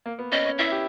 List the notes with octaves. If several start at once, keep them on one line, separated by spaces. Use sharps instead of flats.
A#3
B3
C#4 D#5
C#4
E4 E5
G4